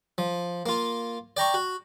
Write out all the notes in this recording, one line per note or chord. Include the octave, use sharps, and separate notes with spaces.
F3
A#3 F4
D5 G5 A#5 C#6
F#4